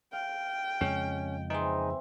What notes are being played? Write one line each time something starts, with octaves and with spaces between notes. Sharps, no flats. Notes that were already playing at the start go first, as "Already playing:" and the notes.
F5 G5
F2 C#3 G#3 C#4
E3 C4 D#4 G#4 E5